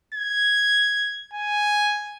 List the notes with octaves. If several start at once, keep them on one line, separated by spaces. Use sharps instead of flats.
G#6
G#5